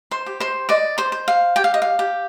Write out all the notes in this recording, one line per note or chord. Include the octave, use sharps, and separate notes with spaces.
C5 C6
G4
C5 C6
D5 D#5 D6
C5 C6
C5
F5
G4 G5
F5
D#5
F5
G4